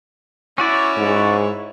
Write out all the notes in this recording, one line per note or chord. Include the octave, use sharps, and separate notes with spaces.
C#4 E4 F#4 C#5 D5
G#2